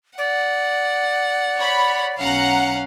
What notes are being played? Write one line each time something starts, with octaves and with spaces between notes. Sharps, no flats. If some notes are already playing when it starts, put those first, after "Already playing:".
D5 F#5
C#5 B5
B1 C#4 F5 F#5 A#5